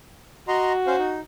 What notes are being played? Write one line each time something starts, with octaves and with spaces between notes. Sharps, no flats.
F#4 D#5 A#5 C6
C#4 C5 F5
D#4